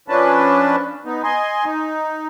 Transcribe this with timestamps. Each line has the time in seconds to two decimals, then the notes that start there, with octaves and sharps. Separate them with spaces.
0.08 F3 C#4 D4 B4 A5
1.05 B3 D#4
1.23 D#5 G#5 C6
1.65 D#4